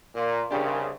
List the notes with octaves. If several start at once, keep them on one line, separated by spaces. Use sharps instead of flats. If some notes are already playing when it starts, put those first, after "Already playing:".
A#2 A#4 F5 C6
C2 C#3 D4 G4